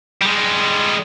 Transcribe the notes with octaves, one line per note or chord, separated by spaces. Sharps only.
G3 G#3